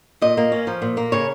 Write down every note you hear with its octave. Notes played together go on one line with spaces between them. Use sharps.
A#2 D#5
A#3
C#4
F3
A#2
A#3
C#3 C#5